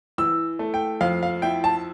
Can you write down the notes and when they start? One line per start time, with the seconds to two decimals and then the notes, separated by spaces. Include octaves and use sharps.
0.18 E3 E6
0.59 A3
0.74 G5
1.01 F2 F5
1.23 F5
1.42 E4 G5
1.64 A5